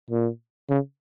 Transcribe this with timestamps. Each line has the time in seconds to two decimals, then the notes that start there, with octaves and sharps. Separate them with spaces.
0.11 A#2
0.69 C#3